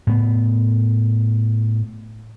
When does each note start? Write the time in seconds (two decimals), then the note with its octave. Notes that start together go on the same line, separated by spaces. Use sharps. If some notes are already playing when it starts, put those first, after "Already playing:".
0.07 A2 B3